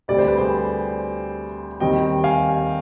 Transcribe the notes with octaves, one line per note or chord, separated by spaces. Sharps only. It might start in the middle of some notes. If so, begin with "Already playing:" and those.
D2 C3 G3 C4 D5
C5
B4
G#4 C5
D#2 D#3 G3 C4 D#5 G5
F5 G#5